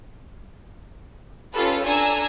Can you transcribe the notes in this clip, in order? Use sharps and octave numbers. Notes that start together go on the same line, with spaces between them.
C#4 F4 G4 A4 B4
D4 A4 G#5 A#5 E6